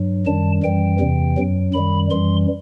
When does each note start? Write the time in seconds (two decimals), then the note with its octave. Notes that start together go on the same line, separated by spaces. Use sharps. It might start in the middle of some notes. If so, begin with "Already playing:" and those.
Already playing: G2 F#3
0.26 F#2 D#3 G3 A5
0.63 F#2 E3 G3 G5
1.00 E2 C3 E3
1.37 F#2 F#3
1.73 F#2 D#3 G3 B5
2.10 F#2 E3 G3 C6